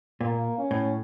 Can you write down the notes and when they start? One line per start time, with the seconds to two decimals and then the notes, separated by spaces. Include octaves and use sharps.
0.21 A#2 A#3
0.58 C#4
0.71 A2